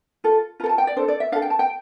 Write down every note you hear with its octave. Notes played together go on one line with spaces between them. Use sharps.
F4 A4
F4 A4 A#5
A5
G5
D5
D4 A4 C5
D5
E5
D4 A4 F5
G5
A5
G5